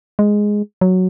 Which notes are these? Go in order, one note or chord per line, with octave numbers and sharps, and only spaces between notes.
G#3
F#3